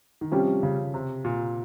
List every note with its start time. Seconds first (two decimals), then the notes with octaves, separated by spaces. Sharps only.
0.21 D#3
0.31 C3 F3 G3 C#4 G4
0.63 C#3
0.94 C3
1.25 A#2